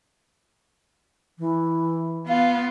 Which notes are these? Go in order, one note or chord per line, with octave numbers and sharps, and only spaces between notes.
E3
B3 F4 F5